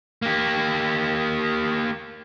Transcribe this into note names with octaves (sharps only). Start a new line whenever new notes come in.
A#3 G4